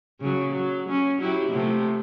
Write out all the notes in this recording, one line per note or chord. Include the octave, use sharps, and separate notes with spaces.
C#3 F#3
F#3
C#4
F#3 E4 G4
C3 F3 A3